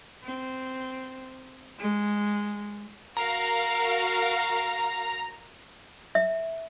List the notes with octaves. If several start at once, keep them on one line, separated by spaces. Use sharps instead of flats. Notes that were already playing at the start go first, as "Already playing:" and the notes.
C4
G#3
F#4 A#4 F5 A#5
E5